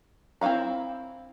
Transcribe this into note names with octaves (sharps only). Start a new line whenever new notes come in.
C4 E4 F4 F5 A#5